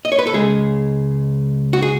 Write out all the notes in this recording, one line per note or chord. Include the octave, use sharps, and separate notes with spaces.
D#5
C#5
B4
A4
C#2 C#3 G#3 G#4
F#4
G#4